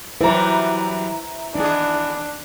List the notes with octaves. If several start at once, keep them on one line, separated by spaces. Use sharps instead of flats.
E3 F#3 G3 E4 B4 C5 A#5
E3 B3 D4 D#4 G#4